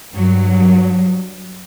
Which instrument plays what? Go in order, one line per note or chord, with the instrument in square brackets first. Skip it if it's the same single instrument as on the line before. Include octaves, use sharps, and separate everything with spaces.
[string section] G2 F#3